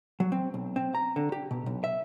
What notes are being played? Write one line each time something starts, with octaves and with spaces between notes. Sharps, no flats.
F#3
C4
B1
C4
A#5
D3
G4
B2
B1
E5